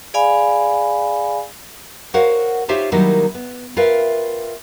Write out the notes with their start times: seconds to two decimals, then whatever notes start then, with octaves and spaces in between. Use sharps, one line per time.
0.14 G#4 D5 F5 G#5 B5
2.14 F#4 A#4 C5 C#5 F5 F#5
2.68 D#4 F4 G4 C5 C#5 E5
2.92 D#3 F#3 G3 A#3 D#4 E4
3.34 B3
3.77 F4 A#4 B4 E5 F5 G5